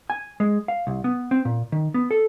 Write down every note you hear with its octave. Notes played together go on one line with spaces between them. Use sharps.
G#5
G#3
F5
C2
B3
C4
A#2
D#3
B3
A4